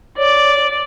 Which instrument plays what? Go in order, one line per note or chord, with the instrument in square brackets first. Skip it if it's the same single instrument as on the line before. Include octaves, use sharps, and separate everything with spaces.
[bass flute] C#5 [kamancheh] D5